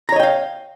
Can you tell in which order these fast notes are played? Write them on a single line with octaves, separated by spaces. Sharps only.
A#5 C#5 D#5 G5 F5